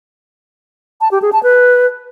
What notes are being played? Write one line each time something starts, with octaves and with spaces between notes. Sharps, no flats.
A5
G4
G#4
A5
B4